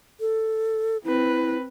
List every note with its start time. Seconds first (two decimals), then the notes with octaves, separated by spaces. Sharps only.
0.20 A4
1.04 C4 E4 B4